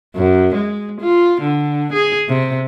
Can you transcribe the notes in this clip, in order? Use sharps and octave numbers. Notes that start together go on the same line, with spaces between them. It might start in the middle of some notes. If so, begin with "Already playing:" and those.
F#2
G#3
F4
D3
G#4
C3